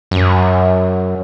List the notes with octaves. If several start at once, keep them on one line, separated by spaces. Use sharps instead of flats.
F#2